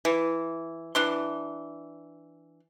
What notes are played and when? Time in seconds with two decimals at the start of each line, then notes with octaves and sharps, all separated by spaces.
0.05 E3
0.95 E3 D4 C6